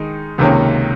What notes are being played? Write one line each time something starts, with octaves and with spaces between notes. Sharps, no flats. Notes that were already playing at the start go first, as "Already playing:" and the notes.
Already playing: D#3 G#3 D#4
C#2 C3 D#3 A#3 C#4